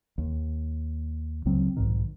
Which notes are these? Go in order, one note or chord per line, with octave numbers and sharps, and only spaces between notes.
D#2
C#2 C#3 F#3 C4
B1 G#2 D#3